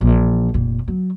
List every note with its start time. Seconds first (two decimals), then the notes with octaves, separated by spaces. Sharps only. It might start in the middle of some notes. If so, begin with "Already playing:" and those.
0.01 A#1 E3
0.54 F1 A#2
0.88 F#3